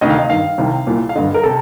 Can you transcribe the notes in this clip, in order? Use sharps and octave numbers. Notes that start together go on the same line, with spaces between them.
D2 C3 D#3 D#5
F5
D#5
G2 D#3 F5
C2 C3 D#3
C2 A#2
F5
G2 D3 D#5
A#4
C3 A4